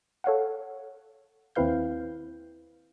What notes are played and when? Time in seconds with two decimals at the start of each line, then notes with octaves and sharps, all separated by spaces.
0.24 A4 C#5 F5 F#5
1.55 D#2 C4 E4 B4 F5 G6